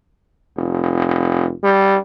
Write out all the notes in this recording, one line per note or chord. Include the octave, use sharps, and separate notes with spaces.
F1
G3